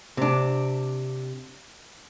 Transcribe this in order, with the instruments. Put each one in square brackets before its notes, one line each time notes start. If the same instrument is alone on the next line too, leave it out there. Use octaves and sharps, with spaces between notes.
[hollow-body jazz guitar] C3 D4